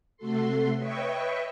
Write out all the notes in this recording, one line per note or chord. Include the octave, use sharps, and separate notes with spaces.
C3 A3 F#4 A4 C6
B4 C#5 D#5 E5 G5 C#6